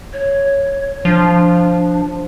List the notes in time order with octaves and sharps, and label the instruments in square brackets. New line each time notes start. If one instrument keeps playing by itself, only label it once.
[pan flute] C#5
[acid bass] F3 [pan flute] D4